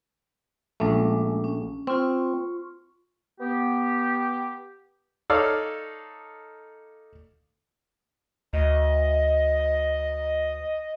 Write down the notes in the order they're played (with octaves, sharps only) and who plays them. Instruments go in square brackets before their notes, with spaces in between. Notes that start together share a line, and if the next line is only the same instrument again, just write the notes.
[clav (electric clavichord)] A#1 A3 [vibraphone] G#3 C#4 D6
[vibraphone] C#4
[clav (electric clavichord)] C4 [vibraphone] F4 C6 C#6
[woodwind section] B3 G4
[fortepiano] D#4 A4 C#5 D5 F5
[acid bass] D2 [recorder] D#5